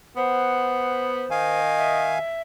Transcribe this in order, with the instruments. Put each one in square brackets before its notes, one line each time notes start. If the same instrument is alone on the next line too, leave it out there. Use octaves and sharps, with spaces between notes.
[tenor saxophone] B3 [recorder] C5 [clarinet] F#5
[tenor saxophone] D#3 [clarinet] D#5 [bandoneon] F5 G#5
[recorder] E5